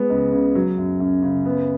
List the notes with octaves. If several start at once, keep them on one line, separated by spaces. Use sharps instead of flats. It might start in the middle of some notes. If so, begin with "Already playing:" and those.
Already playing: G#3 B3
C#2
C#3
F#3
F#2
F#2
C#3
B3